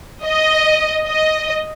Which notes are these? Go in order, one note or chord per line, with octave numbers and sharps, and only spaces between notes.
D#5
D#5